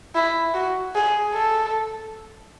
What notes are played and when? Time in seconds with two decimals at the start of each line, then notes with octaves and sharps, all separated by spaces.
0.15 E4
0.54 F#4
0.95 G#4
1.34 A4